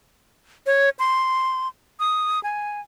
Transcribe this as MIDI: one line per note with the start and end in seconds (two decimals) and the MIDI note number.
0.66 0.89 73
0.99 1.68 84
2.00 2.42 87
2.43 2.81 80